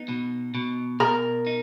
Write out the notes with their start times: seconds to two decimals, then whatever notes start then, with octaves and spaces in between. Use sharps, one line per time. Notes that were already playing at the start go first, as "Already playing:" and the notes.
Already playing: B3 D#4
0.09 B2
0.55 B2
1.00 B2 A#4
1.47 D#4